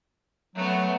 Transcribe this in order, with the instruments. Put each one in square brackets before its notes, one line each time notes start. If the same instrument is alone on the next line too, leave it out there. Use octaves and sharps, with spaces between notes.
[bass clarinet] F#3 [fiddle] A3 B3